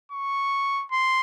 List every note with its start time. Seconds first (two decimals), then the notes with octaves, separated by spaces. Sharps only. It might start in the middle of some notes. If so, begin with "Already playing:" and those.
0.12 C#6
0.92 C6